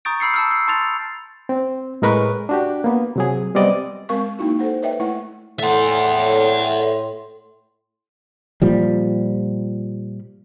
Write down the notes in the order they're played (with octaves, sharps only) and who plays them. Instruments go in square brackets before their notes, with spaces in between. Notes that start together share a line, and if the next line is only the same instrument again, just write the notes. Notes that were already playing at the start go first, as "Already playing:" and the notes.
[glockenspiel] A#5 C#6 D#6 G6 A6 D7
B5 E6 C7 C#7
A5 E6 F6
C7
A5 C6 A6 F7
[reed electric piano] C4
A2 G#3 A#4 B4 C#6
D4 F#4 G4
A#3 B3
C3 F#3 G#4
G3 B3 C4 D5 D#5
[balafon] G#3 C4 A#4 F5 C#6
A#3 D#4 E4 F#4
A4 C5 F#5
B4 C#5 D#5 E5 G5
A3 E4 F#5
[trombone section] A2 [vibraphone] A4 C6 [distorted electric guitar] E5 F#5
[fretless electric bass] A#2 F3 G3